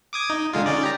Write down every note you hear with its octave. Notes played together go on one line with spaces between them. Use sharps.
D6 D#6 G#6
D#4
D3 G#3 F4
C#4 D#4 D5
G4 A#5